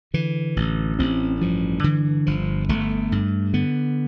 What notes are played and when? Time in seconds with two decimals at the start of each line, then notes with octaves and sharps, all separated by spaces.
0.14 D3 E3
0.56 A1
0.99 A1 C4
1.41 G2 F3
1.84 D3 E3
2.26 G1 F3
2.69 G1 A3
3.12 G2
3.53 D3 B3